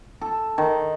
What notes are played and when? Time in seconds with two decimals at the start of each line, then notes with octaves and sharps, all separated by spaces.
0.21 A4
0.58 D#3